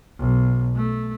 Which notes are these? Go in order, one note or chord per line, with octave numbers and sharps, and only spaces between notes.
B1
A3